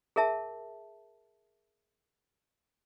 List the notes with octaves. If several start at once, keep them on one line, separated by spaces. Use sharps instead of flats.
G#4 A#4 E5 A5